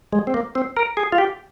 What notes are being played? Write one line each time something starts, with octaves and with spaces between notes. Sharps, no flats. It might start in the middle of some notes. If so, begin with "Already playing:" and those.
G#3
C4
A#3
C4
A#4
G#4
F4
G4